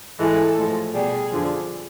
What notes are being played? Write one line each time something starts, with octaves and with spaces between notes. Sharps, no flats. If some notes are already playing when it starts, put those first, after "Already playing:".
G#2 E3 G#3 A4
A2 F3 G#3
B2 G3 G#4
F2 D3 F3